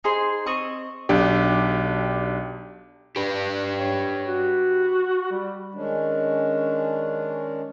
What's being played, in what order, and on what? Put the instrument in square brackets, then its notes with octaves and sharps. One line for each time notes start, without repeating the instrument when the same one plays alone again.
[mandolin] D#4 G#4 C5 C6
C4 D#5 C#6
[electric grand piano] B1 D4 G4
[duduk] D4 [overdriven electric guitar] G4 B4
[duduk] C#5
F#4
G3
[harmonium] D#3 G#3 C#4 D4